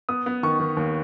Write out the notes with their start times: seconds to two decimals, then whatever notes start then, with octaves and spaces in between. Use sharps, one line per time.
0.09 B3 D#6
0.26 B3
0.43 D#3 C#6
0.60 D#3
0.77 D#2